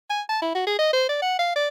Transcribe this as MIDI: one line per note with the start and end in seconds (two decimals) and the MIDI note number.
0.10 0.22 80
0.29 0.38 81
0.42 0.52 64
0.55 0.64 66
0.67 0.74 68
0.79 0.91 75
0.93 1.05 72
1.09 1.21 74
1.22 1.37 78
1.39 1.51 77
1.56 1.68 74